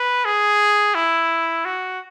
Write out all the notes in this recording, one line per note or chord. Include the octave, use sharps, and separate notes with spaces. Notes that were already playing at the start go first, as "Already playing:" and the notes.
Already playing: B4
G#4
E4
F#4